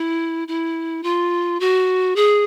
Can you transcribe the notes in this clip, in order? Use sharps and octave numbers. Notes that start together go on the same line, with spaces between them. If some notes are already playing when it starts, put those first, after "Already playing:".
Already playing: E4
E4
F4
F#4
G#4